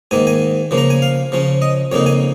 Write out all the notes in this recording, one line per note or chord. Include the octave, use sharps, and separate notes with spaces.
G#2 D#3 A#3 G#5
G#5
C#3 F3 A#3
A#5
G#5
F5
C#3 F3 C#4
D#5
F2 C#3 A#3 D#4 C#5
G#5